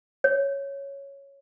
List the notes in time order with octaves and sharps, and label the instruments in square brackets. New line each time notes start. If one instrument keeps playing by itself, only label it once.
[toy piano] C#5